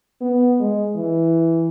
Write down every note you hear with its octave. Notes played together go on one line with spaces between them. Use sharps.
B3
G#3
E3